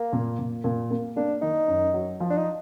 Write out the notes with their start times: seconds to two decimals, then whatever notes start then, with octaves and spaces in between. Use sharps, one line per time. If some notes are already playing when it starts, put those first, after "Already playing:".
Already playing: A#3
0.13 A#2
0.39 A#2
0.64 A#2
0.91 A#3
1.17 A#3 D4
1.42 D#3 D#4
1.68 F#2
1.94 F#3
2.20 F3
2.30 D4
2.38 D#4